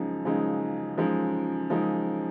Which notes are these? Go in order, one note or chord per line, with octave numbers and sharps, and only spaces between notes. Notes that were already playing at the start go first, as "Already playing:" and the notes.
Already playing: F#2 C#3 F3 G#3 D#4
F#2 C#3 F3 G#3 D#4
F#2 C#3 F3 G#3 D#4
F#2 C#3 F3 G#3 D#4